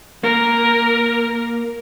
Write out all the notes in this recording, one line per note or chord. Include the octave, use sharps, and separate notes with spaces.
A#3 A#4